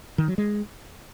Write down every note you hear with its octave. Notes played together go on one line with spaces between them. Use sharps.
D#3
F#3
G#3